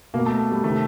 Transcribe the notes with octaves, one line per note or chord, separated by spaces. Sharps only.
B2 A#3
A3
G3
C3 D#3 A3